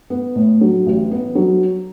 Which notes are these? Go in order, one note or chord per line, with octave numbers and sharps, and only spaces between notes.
B3
A2
F#3
A1
B3
F#3